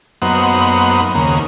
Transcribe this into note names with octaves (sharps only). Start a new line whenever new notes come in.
F#2 A#3 B3 D#4 C5 F#5
D#2 C#3 A#3